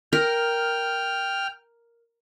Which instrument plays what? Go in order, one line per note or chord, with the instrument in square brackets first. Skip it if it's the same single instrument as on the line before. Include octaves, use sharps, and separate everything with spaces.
[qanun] A#4 [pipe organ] G5 F6